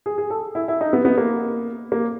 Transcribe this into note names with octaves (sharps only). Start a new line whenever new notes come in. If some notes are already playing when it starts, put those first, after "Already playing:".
G#4
G#4
A4
E4
E4
D#4
B3
B3
A#3
A#3